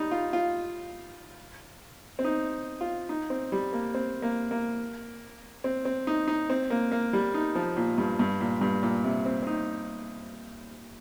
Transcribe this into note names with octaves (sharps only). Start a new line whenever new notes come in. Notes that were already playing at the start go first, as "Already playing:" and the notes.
Already playing: G3 D#4
F4
F4
C4
D#4
F4
D#4
C4
G3
A#3
C4
A#3
A#3
C4
C4
D#4
D#4
C4
A#3
A#3
G3
D#4
F3
A#2
G2
G2
A#2
G2
A#2
C3
C4
C4
D#4